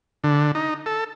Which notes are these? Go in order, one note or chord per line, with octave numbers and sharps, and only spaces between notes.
D3
D#4
A4